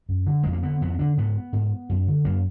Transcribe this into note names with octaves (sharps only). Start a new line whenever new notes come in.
F#2
D3
F2 G#3
A#3
D3 B3
F2 B3
D3 D4
G#2 B3
G#2
F#2
D3
F#2 A#3